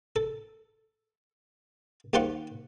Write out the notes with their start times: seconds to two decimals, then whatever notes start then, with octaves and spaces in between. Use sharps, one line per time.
0.16 A4
2.13 D#2 G3 F4 C5 F#5 C#6